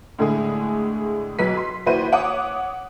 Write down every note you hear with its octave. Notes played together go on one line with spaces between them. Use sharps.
A2 D3 G#3 A3 G#4
B1 F#3 B4 B6
C6
D#2 E4 F#4 B4 C5 D#7
C#5 F#5 D6 D#6